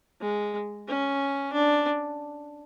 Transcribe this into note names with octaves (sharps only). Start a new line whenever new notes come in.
G#3
C#4
D4